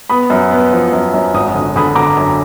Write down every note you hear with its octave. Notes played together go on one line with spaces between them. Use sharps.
B3 B5 D#6
F#2
B3
F3
F#2
F#2
G#1 D#6
D3 D#6
D3 B5 D#6
D3 A#5 D6
F#2